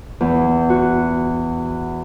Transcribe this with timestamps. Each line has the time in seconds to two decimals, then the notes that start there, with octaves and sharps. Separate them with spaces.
0.21 E2
0.70 F#4